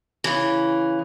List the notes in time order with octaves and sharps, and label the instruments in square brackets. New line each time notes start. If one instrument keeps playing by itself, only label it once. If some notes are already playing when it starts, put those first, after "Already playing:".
[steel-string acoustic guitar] C#3 E3